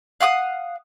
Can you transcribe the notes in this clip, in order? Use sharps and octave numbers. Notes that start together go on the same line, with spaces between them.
F5 F#5 D6 D#6